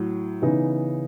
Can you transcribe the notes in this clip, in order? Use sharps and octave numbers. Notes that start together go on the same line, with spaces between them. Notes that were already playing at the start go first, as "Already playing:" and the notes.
Already playing: A2 F#3
C#3 E3 B3 D#4